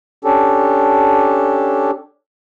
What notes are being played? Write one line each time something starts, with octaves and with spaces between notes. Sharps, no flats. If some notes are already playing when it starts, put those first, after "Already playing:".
C#4 D4 G4 A4